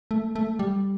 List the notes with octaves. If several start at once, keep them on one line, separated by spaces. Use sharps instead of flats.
A3
A3
G3